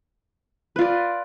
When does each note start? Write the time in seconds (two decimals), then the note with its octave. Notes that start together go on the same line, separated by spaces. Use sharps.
0.76 B4
0.79 F4
0.81 D5